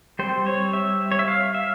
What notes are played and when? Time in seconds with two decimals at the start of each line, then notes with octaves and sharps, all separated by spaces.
0.19 G3 C4 C5
0.47 C#5
0.73 E5
1.12 C#5
1.19 E5
1.28 F5
1.54 E5